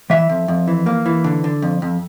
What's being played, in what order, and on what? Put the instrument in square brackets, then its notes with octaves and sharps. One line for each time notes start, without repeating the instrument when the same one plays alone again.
[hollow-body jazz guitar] E3 E5
F2
F2
E3
A#3
E3
D3
D3
F2
F2